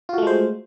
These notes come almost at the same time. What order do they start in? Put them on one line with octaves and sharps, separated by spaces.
F4 F#4 A3 G#3 C5